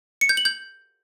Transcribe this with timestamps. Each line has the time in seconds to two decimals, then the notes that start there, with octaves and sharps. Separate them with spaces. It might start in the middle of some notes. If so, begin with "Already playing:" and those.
0.21 C#7
0.29 G6
0.37 F#7
0.45 G6